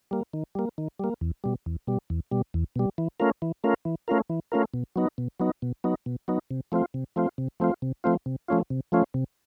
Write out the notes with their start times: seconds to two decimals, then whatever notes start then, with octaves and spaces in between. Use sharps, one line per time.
0.11 G3 A#3
0.33 D#3
0.55 G3 A#3
0.78 D#3
0.99 G3 A#3
1.21 E2
1.44 B2 G3
1.66 E2
1.87 B2 G3
2.10 E2
2.31 B2 G3
2.54 E2
2.76 B2 G3
2.98 E3
3.20 A3 C#4 F4 A#4
3.42 E3
3.64 A3 C#4 F4 A#4
3.85 E3
4.08 A3 C#4 F4 A#4
4.30 E3
4.52 A3 C#4 F4 A#4
4.74 B2
4.96 F#3 B3 D#4
5.18 B2
5.40 F#3 B3 D#4
5.62 B2
5.84 F#3 B3 D#4
6.06 B2
6.28 F#3 B3 D#4
6.51 C3
6.72 F3 A3 C4 F4
6.94 C3
7.16 F3 A3 C4 F4
7.38 C3
7.60 F3 A3 C4 F4
7.82 C3
8.04 F3 A3 C4 F4
8.26 C3
8.48 F3 A3 C#4 F4
8.70 C3
8.92 F3 A3 C#4 F4
9.14 C3